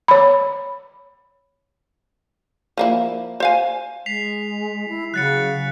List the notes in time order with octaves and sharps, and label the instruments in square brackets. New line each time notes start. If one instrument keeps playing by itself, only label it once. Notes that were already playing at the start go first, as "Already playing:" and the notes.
[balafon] C#5 B5
[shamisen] F3 A#3 E4
C5 F5 G#5
[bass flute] G#3 [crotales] B6 C7 F7
[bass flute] E4
[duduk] C#3 [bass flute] F#3 [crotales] F#6 A6 C#7